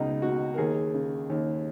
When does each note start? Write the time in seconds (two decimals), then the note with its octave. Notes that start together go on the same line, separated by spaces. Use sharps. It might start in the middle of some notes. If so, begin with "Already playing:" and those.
Already playing: C#2 B2 D#4
0.22 B2 F#4
0.54 A#4
0.58 D#2 G#4
0.94 C#3
1.30 D#2